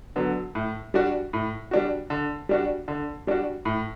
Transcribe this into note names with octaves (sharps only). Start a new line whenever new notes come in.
D3 F#3 B3
A2
G3 D4 F#4
A2
G3 D4 F#4
D3
G3 D4 F#4
D3
G3 D4 F#4
A2